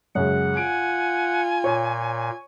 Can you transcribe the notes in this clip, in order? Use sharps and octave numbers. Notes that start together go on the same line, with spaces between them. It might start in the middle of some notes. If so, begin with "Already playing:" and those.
F#2 C#3 G#3 F#5
F4 G#5 D7
A#2 C#5